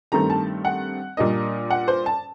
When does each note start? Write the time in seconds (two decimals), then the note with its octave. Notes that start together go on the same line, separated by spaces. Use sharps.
0.12 G2 D#3 A3 C4 A#5
0.30 A5
0.65 F#5
1.17 A#2 G3 A#3 D4 D#5
1.70 F#5
1.88 C5
2.06 A5